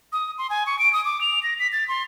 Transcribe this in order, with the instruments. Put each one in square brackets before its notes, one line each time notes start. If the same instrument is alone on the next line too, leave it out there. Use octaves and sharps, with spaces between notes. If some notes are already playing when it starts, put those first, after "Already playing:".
[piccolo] D#6
C6
G#5
C#6
D7
D#6
D6
F7
A#6
B6
A6
C6